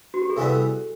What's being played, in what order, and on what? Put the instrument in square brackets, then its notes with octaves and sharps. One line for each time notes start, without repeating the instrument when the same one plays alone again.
[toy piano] F#4
G4
G#4
[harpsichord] C3 E3 G3 B3 [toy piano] A4